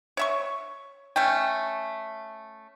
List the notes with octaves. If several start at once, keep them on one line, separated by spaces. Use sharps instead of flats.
C#5 E5 C#6
A3 C#4 G5